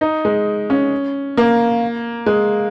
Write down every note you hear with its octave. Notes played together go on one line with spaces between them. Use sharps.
D#4
G#3
C#4
A#3
G#3